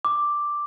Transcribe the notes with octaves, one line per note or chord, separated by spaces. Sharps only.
D6